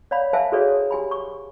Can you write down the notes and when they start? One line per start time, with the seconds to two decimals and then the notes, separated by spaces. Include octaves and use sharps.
0.11 C#5 D5 F5 B5
0.33 A#4 C5 E5 F5 G#5 A5
0.52 F#4 G#4 A4 B4 C#5 D5
0.91 G4 G#5 B5
1.11 C#6